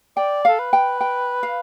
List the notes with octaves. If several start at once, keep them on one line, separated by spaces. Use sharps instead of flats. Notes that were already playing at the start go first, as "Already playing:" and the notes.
D5 G5
A4 F5
B4
G5
G5
F5